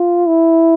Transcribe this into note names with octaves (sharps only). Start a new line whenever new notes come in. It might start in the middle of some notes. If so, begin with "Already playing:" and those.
Already playing: F4
E4